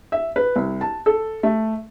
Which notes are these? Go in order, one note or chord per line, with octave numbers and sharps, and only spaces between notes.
E5
B4
C2
A5
A4
A3